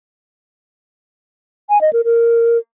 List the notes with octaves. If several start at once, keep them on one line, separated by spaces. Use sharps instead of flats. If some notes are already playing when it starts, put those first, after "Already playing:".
G#5
D#5
A#4
A#4